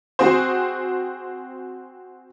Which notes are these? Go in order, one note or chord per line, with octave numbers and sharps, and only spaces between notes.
C4 F#4 G#4 C5